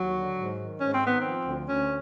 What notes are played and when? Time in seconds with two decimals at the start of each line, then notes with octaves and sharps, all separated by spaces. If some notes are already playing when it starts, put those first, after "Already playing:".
Already playing: D#2 F#3
0.15 D3
0.36 G#2
0.58 D#3
0.80 G#2 C#4
0.92 C4
1.02 D#3 B3
1.18 C4
1.23 F3
1.45 D2
1.67 D2 C#4